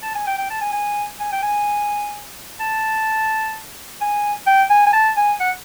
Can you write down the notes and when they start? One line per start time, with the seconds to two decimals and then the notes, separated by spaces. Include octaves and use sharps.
0.03 A5
0.15 G#5
0.27 G5
0.38 G5
0.50 A5
0.61 G#5
0.73 G#5
1.20 G#5
1.32 G5
1.43 G#5
2.60 A5
4.01 G#5
4.47 G5
4.70 G#5
4.87 G#5
4.93 A5
5.17 G#5
5.40 F#5